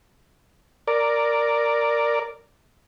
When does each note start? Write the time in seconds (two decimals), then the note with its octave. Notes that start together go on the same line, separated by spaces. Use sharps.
0.87 A#4 D5